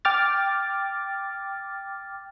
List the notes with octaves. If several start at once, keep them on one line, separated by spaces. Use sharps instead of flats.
G5 D6 F6 A6